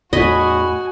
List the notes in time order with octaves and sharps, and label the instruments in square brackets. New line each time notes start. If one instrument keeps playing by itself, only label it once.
[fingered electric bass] E2 A2 A3 [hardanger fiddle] F#4 G#5 [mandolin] C#5 B5 [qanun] D#5